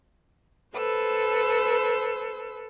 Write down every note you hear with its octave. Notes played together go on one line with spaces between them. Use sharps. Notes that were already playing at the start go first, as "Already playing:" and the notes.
A4 B4 C5 E6